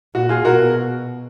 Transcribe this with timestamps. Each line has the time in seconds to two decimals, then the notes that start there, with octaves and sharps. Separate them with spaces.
0.14 A#2 F#4
0.29 F4 G#4
0.45 B2 F#4 A#4